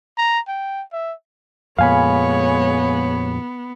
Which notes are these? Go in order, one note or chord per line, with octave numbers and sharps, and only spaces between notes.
A#5
G5
E5
F2 A#2 G#3 B3 C#5 F5 G#5 B5